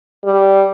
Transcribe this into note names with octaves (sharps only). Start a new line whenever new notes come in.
G3